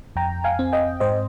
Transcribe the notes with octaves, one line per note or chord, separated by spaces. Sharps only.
F2 G5 A#5
F5 G#5
C4
D#5 G5
G#2 C5 D#5